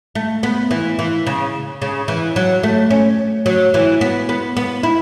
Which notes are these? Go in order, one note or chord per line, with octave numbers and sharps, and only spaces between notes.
A3
B3
E3
E3
C#3
C#3
E3
F#3
A3
C#4
F#3
E3
B3
B3
B3
E4